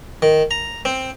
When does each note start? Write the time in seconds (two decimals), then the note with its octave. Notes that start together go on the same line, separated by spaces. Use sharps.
0.22 D#3
0.51 A#5
0.85 C4